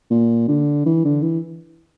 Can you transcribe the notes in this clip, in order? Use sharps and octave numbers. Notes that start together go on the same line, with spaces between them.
A#2
D3
E3
D3
E3